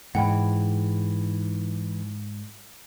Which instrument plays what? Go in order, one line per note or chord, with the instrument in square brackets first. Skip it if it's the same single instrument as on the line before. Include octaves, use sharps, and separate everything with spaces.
[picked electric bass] G#2 [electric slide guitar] E3 [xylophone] F#5 G5 B5